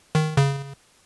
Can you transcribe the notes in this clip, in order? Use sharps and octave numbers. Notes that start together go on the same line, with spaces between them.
D#3
C#3